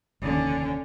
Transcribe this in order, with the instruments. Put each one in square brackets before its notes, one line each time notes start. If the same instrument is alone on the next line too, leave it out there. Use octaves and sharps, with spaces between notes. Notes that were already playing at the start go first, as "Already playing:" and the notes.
[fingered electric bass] F1 D#2 [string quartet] D3 C#4